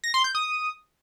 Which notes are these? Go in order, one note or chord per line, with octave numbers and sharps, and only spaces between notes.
A#6
C6
G6
D#6